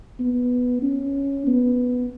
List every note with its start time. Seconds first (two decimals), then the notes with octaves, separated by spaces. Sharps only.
0.20 B3
0.83 C#4
1.47 B3